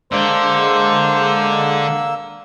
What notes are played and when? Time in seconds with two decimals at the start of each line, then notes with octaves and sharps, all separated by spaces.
0.12 D3 G#3 A#3 C5 E6